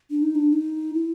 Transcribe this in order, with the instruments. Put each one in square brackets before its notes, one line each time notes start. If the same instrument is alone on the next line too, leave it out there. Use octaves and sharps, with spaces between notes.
[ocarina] D4
D#4
D4
D#4
E4